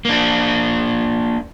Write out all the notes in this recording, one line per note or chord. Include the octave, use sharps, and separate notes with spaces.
A#3 D4